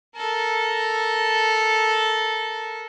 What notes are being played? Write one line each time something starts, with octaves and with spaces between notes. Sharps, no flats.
A4 A#4